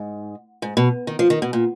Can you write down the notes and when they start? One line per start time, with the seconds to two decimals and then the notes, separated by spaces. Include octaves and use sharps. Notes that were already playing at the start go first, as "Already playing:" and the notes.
Already playing: G#2
0.62 G#2
0.77 B2
1.07 D#3
1.19 F3
1.30 D#3
1.42 B2
1.53 A#2